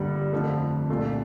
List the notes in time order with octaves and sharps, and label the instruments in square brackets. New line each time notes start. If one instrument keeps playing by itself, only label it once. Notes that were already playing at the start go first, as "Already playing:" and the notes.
Already playing: [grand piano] G1 G2 D3 G3 A#3
G1 F2 D3 F3 A3
C2 A#2 A3 D4 F4